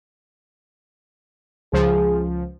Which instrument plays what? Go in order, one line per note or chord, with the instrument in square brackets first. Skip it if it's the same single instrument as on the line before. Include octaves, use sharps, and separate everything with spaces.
[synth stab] C#2 F3 [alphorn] G#4